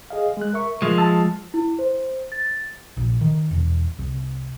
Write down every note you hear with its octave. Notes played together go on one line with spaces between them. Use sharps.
G#4 D#5 F5
G#3 F#6
A#4 E5 C#6
F3 G#3
A5 E6
E4
C5
A6
A#1
D#3
E1
C2